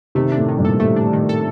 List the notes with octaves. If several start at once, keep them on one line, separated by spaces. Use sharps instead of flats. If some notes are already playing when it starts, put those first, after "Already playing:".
C3 D#3 A3
D4
A2
D#3
G2 A#2
A4
A2 A3
D4
D#3
A4